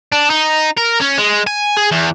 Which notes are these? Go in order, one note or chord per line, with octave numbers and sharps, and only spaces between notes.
D4
D#4
A#4
C#4
G#3
G#5
G#4
E2